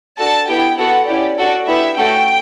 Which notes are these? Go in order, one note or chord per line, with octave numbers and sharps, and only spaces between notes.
D4 F#4 A4 A5
B3 E4 G4 G5
B3 F#4 A4 F#5
C#4 E4 G4 D5
D4 F#4 A4 D5
B3 E4 G4 E5
A3 C#4 F#4 A4 G5